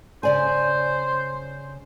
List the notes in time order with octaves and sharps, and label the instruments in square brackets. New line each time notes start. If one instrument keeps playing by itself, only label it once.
[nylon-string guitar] C#3 D5 G#5 [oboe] C5